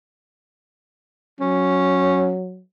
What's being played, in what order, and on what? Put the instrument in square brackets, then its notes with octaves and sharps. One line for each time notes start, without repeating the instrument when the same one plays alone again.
[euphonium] F#3 [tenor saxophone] C#4